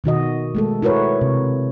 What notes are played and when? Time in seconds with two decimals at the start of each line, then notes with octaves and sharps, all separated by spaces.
0.04 B2 D#3 F#4 D#5
0.55 G#3 A3 A4
0.82 E4 F#4 A#4 B4 C#5
1.21 C3